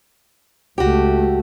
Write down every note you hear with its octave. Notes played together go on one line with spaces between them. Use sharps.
C#2 A3 F#4 G4